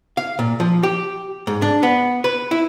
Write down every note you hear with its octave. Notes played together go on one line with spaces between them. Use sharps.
F5
A#2
F3
G4
G#2
D4
B3
B4
E4